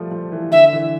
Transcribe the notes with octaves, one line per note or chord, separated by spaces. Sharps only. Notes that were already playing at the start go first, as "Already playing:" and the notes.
Already playing: F3 G3 A3
F3
E3
D3 E5
E3